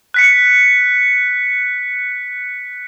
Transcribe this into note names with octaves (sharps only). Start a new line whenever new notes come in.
F#6 B6 C#7